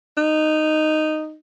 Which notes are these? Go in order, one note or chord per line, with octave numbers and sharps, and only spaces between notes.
D#4